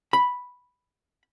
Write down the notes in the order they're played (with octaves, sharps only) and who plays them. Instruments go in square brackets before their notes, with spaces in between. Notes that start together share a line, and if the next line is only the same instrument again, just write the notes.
[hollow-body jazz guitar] B5